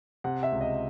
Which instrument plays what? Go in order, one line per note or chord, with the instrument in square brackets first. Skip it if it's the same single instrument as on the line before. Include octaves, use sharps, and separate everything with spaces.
[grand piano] C3 [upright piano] F#5
[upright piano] E5
[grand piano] C#2
[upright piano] D#5